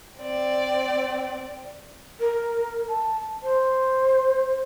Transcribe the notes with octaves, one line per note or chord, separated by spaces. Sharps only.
C4 D5
A#4
A5
C5